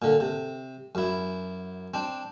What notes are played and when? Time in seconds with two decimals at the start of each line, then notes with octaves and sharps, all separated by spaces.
0.02 A#2 D3
0.20 C3
0.95 F#2 E4
1.94 C4 D4